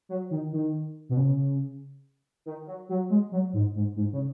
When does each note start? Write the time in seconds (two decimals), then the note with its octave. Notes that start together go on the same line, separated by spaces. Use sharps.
0.09 F#3
0.31 D#3
0.52 D#3
1.09 B2
1.17 C#3
2.46 D#3
2.67 F#3
2.89 F#3
3.10 G#3
3.32 F#3
3.53 G#2
3.75 G#2
3.96 G#2
4.13 C#3